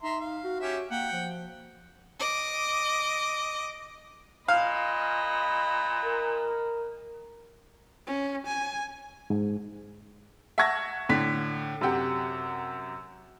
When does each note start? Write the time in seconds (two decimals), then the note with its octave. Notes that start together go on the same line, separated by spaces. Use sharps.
0.03 D#4 E5 A#5 C6
0.20 F5
0.44 F#4
0.60 C#4 G4 E5
0.91 A#3 F#5 G5
1.12 F3
2.20 D#5 D6
4.48 A#2 D#5 F5 B5
6.04 A#4
8.07 C#4
8.47 G#5
9.30 G#2
10.58 E5 F#5 A5 C#6 G#6 A#6
11.09 A2 D3 B6
11.81 F#2 C3 G4 F#5